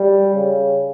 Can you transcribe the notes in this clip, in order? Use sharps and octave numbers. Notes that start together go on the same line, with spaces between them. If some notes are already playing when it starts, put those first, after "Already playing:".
Already playing: G3
C#3